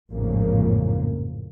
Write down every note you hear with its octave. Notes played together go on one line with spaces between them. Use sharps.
A1 F2 G#2 C#3 F3 A#3